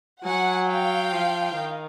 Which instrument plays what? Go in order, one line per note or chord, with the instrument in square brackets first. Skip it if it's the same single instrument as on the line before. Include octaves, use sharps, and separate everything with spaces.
[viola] F#3 [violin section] F#5 G#5
[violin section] F5 G5
[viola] F3
D#3